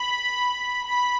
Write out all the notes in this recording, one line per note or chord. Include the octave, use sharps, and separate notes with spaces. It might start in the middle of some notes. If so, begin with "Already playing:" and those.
Already playing: B5
B5